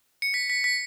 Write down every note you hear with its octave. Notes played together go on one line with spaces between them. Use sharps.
C#7
B6
B6
B6